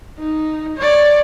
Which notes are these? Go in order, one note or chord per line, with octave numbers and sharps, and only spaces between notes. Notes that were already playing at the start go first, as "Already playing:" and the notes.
D#4
C#5 D5